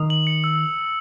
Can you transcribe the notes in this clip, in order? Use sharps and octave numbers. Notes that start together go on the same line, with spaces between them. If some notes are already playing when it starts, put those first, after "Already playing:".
Already playing: D#3 D#6
F#7
C#7
E6